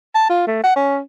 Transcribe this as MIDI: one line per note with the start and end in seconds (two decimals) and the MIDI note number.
0.15 0.28 81
0.30 0.46 65
0.47 0.59 57
0.64 0.75 78
0.76 0.99 61